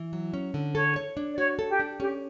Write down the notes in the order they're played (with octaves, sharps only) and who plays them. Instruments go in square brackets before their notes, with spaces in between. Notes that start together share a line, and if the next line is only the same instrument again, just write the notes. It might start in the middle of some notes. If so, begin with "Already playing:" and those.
Already playing: [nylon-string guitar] E3
F#3
C#4
D3
[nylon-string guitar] A4 [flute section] C#5
[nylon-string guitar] C#5
D4
[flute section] D5
[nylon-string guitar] F#4 [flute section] C#5
[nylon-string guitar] A4
[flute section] G4
[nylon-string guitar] D4
[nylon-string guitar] C#4 [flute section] G4